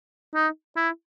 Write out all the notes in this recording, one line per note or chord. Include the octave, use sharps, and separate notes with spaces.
D#4
E4